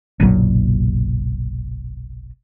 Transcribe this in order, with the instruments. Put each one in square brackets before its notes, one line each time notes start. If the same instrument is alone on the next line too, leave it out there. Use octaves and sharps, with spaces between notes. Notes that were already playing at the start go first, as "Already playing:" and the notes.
[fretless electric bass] F#1 B1 A#2 F#3